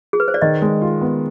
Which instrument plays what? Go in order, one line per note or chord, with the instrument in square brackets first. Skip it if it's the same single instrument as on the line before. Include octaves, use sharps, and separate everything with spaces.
[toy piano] G#4
B4
C5
D5
[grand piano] D#3 [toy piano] D#5
[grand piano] G#3
F4
B3